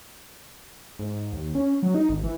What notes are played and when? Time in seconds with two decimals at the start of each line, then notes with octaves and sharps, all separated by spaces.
0.99 G#2
1.13 G#2
1.33 D#2
1.55 C#4
1.83 F#3
1.95 D#4
2.09 G#1
2.24 E3